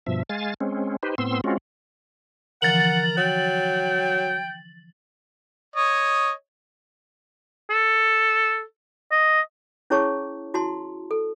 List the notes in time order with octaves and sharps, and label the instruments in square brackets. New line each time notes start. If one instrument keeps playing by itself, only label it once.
[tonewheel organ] G2 B2 F3 E5
G#3 F5 G#5 A6
G#3 C4 C#4
D#4 G4 B4 C5
A2 B3 C4 C6 E6
G#3 C4 C#4 F4 F#4
[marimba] D3 E3 F3 [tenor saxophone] A#4 [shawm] F#5 [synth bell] A6 F#7
[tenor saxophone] F#3 [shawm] G5
[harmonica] C#5 D#5
[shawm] A4
D#5
[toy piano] C#4 E4 G#4 C#5 A5 C#6
E4 F#4 A5 C6
A4